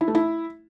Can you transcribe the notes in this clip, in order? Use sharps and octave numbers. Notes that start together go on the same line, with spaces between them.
E4
A3
E4